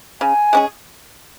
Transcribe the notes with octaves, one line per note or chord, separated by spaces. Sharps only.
C#3 G#5
G#3 C#4 G#4